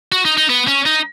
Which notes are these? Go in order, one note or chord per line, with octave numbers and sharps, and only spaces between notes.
F#4
D#4
D#4
B3
C#4
D#4